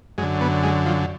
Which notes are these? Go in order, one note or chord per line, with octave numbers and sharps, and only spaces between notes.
F#2 D3 G#3
B3
G#3
F3